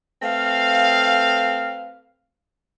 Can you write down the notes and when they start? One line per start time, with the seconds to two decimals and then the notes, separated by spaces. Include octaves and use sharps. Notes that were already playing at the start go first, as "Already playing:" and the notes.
0.22 A3 C4 B4 F5